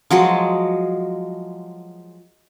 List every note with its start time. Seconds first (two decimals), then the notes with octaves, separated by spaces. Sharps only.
0.11 F3 F#3 G#3 D#5